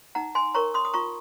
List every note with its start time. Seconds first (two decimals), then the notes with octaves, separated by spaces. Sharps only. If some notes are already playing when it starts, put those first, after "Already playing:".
0.15 D#4 F#5 A#5
0.35 G#5 C6
0.54 A#4 C#5 A#5 C#6
0.74 C6 D#6
0.85 D#6
0.94 F4 A#5 C#6